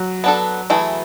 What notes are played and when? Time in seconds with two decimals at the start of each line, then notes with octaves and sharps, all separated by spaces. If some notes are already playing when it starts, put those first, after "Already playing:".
Already playing: F#3
0.24 B3 D4 A4
0.70 E3 A3 E4 G#4